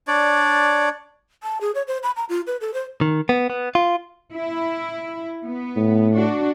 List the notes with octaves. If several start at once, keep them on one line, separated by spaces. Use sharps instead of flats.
D4 C#5 D5
A5
G#4
C#5
C5
B5
A#5
F4
B4
A4
C5
D#3
B3
B3
F4
E4
B3
A2
D4 F#4